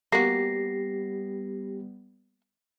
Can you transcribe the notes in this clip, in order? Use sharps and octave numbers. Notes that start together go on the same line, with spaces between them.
G3 A#3 B3 F#4 G4 A#6 C7